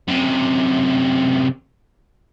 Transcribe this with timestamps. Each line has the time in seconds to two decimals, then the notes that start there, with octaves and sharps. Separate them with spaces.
0.08 F#2 C3